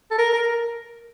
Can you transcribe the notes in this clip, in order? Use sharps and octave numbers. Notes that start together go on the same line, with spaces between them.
A4
A#4
A#4